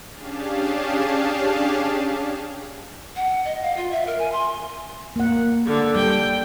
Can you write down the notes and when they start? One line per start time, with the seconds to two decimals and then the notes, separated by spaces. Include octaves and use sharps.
0.11 C#4 D4 G4 G#4 F5 A5
3.16 F#5
3.45 D#5
3.62 F5
3.77 F4
3.91 E5
4.07 A#4
4.19 G#5
4.32 C6
5.16 A#3 F#5
5.66 D3
5.96 G3 G5